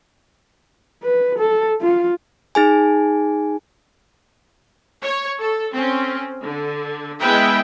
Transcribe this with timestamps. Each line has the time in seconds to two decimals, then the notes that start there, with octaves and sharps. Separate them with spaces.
1.03 B4
1.39 A4
1.81 F4
2.55 D#4 G#4 G#5
5.02 C#5
5.40 A4
5.73 C4 C#4
6.43 D3
7.19 G#3 B3 E4 B4 E5 G5